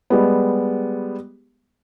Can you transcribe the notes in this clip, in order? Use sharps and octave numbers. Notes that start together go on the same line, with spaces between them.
G3 G#3 B3